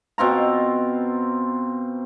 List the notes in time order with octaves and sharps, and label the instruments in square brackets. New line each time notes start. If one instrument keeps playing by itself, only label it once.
[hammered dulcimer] B2 C4 F4 A#5